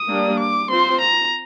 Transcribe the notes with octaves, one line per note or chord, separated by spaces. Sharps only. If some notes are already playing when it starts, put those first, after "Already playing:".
Already playing: D#6
G3 A#3 D4
D6
C4 F4 C5 C6
A#5